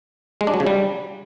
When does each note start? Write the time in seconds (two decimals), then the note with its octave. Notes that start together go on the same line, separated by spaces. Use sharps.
0.41 G#3
0.47 D4
0.54 F#3
0.60 C#3
0.67 G3